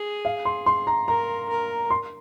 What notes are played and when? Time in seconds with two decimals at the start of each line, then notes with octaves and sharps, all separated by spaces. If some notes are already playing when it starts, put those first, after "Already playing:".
Already playing: G#4
0.25 F5
0.45 C6
0.66 C6
0.87 A#5
1.08 A#4 A#5
1.49 A#4
1.90 C6